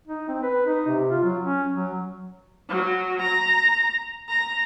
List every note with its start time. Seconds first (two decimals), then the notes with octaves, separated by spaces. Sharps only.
0.08 D#4
0.28 C4
0.42 B4
0.66 D#4
0.87 C3
1.10 F4
1.23 F#3
1.44 C#4
1.74 F#3
2.69 F#3
3.22 A#5
4.29 A#5